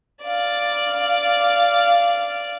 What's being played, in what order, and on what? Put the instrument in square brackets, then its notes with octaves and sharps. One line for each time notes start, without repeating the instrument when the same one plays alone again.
[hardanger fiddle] D5 F5